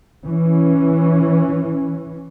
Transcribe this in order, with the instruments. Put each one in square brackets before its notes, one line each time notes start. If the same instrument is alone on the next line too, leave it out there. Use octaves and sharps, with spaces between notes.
[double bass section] E3 C#4